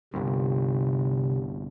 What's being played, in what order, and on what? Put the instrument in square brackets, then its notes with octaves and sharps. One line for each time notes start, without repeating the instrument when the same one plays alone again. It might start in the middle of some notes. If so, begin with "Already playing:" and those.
[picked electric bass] G1 C2 [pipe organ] C3